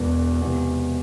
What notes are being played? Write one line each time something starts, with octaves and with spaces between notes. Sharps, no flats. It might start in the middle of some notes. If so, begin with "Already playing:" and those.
Already playing: E1 E2 B2 B3
E1 E2 C3